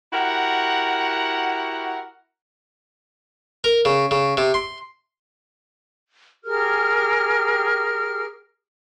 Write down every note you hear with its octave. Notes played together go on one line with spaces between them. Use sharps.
E4 F#4 G4 A#4 F#5
A#4
C#3
C#3
C3
C6
G4 G#4 A#4 F6